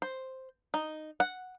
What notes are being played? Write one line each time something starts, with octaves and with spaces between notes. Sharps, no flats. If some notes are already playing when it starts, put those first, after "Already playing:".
C5
D#4
F#5